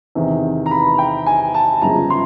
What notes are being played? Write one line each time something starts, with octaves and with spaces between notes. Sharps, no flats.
E2 C3 D#3
A#5
B5
G5
G#5
A5
G1 F#2 C#3 F3 G#3 A#5
C6